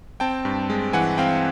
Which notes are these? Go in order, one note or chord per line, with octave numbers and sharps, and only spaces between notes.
C4 G5 A5
G2
G#3
E3 F#5 G#5
C4 F5 G5